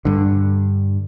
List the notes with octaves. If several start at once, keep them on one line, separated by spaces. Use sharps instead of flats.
G2 D3